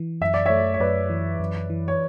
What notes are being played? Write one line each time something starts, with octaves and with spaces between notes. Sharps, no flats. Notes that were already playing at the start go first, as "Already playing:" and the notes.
Already playing: E3
F#2 E5
D5
A3 C#5 E5
C#5
F#2 B4 D5
E3
F#2
E3
C#5